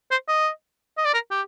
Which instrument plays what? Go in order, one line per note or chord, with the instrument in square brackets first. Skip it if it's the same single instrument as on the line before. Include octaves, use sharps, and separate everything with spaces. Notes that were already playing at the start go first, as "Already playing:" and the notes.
[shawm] C5
D#5
D#5
D5
A#4
G4